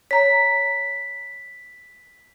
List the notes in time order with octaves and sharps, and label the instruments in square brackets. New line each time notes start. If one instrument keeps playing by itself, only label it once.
[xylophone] C#5 A#5 [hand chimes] B6